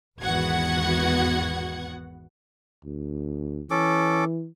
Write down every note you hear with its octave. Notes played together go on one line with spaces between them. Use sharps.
G#1 E2 B3 F#4 F#5 G#6
D2
E3 C#4 A4 D6